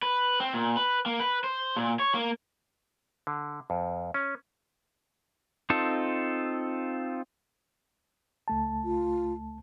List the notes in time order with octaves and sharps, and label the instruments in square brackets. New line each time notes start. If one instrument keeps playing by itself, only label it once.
[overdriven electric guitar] B4
C4
A#2
B4
A#3
B4
C5
A#2
C#5
A#3
[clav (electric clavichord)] D3
F2
C#4
[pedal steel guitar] C4 D#4 F4 A4
[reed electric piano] C#2 A3 A5
[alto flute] F4